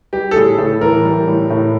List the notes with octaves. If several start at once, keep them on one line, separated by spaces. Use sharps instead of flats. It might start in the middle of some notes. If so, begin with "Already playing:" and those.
G3 G4
A4
A2 G#4
A2 A4
E3 A#4
G3
A2
A2